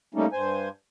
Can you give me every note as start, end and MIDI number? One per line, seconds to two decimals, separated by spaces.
0.14 0.26 55
0.14 0.26 57
0.14 0.26 58
0.14 0.26 61
0.14 0.26 63
0.33 0.69 43
0.33 0.69 72
0.33 0.69 80